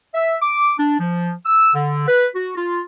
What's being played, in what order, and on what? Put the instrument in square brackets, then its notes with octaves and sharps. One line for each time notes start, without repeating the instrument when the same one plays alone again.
[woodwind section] E5
D6
D4
F3
E6
D3
B4
F#4
F4